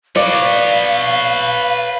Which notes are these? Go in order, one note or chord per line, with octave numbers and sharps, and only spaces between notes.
B4 C#5 D5 F5